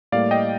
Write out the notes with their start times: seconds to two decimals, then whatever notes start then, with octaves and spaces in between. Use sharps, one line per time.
0.12 A2 G3 A#3 D5 F5
0.31 D#5 G5